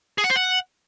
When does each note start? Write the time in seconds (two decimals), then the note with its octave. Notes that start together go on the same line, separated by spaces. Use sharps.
0.18 G#4
0.24 F#5
0.30 C5
0.36 F#5